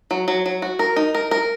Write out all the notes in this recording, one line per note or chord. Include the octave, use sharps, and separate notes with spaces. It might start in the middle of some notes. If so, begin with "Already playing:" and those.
F#3
F#3
F#3
F#4
A#4
D#4
A#4
A#4